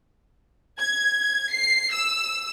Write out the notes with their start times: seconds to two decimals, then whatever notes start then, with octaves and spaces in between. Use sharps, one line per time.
0.79 G#6
1.52 C7
1.93 E6